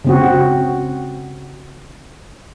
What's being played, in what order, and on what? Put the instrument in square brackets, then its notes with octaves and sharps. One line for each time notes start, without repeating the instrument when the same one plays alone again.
[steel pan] C#3 C4 F#4